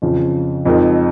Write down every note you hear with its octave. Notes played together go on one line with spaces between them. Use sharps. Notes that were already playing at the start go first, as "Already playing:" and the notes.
F2 C#3 F3
F2 F3 G#3 D#4 A#4